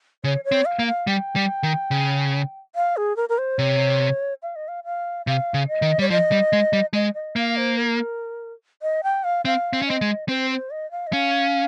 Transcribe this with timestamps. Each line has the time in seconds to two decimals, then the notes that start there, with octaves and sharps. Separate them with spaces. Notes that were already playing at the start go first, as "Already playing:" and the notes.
0.24 C#3 C#5
0.45 C#5
0.52 C4
0.65 F5
0.79 A#3
0.87 F5
1.07 G3 G5
1.36 G3
1.63 D#3
1.91 C#3
2.76 F5
2.97 G#4
3.17 A#4
3.29 A#4
3.38 C5
3.59 C3 C#5
4.43 F5
4.56 D#5
4.68 F5
4.84 F5
5.26 C3 F5
5.54 C#3
5.68 D#5
5.82 D#3
5.99 G3 C#5
6.10 F3 D#5
6.32 G3
6.53 G#3
6.73 G3
6.94 G#3 D#5
7.15 D#5
7.36 A#3 F5
7.57 C5
7.78 A#4
8.82 D#5
9.03 G5
9.24 F5
9.45 C4 F5
9.73 C4
9.82 C#4
9.87 C4 D#5
10.01 G#3
10.29 C4 C5
10.50 C5
10.71 D#5
10.91 F5
11.07 D#5
11.13 C#4 F5